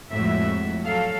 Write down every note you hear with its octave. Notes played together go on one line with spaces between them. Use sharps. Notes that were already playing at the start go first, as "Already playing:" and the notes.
F2 A2 G#3 F#4 E5
F#3 A4 F5